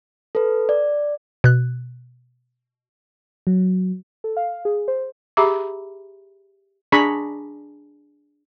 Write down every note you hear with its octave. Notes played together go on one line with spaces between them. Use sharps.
A4 B4
D5
B2 F#6
F#3
A4
F5
G#4
C5
G4 G#4 E5 A#5 B5 D6
D4 G#4 A#5 B5 C#6